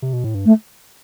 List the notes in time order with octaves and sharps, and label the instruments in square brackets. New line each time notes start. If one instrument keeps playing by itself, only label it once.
[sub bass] C3
B2
A2
G2
[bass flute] A3